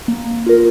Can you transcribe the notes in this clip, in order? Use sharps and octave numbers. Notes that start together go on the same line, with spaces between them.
A#3
F4 A#4